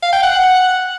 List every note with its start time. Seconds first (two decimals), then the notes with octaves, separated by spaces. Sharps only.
0.03 F5
0.13 G5
0.23 F#5